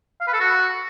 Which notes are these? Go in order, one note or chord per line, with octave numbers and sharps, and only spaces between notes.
F5
B4
A4
F#4